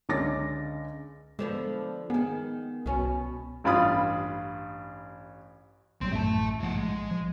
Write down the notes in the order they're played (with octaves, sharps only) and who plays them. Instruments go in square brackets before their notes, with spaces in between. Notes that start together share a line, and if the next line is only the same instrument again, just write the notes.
[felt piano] C#2 D3 C#4 D6 A6 A#6
[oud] D3 F3 B3 [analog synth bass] G#3
[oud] D#3 G#3 [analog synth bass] B3
[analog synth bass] C2 [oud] B2 C#4
[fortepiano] A1 G2 F4 F5 B5 D#6
[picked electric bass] A#1 F#3 G3 [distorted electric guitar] C4 C6
[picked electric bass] A1 F#2 A3 [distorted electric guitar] E5 A5
[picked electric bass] A#1 D3 F3 [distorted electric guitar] A2 F#5
[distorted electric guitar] G#3
[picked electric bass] F3